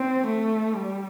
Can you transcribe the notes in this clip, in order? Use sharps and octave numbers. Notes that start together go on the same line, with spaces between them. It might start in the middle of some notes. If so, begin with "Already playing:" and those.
Already playing: C4
A3
G3